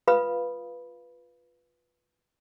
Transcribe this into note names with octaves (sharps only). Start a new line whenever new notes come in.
F4 B4 F5 B5 D#6